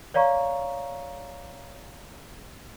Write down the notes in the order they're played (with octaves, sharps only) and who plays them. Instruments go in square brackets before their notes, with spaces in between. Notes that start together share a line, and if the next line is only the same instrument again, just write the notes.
[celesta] C#5 D5 F5 A#5 C#6